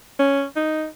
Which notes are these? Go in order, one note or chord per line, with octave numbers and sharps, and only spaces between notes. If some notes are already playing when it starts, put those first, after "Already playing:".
C#4
D#4